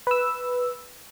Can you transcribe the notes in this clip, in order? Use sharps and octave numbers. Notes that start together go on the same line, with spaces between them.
B4 E6